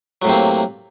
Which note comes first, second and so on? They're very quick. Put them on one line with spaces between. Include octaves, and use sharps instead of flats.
F#3 A2 C3 C4 A#3